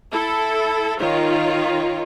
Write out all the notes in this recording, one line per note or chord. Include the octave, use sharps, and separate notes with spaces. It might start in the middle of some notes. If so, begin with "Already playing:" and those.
E4 A4
D#3 F4 C#5